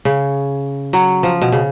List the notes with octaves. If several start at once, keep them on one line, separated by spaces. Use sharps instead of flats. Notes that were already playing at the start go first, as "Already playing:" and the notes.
C#3
F#3
F3
B2
C#3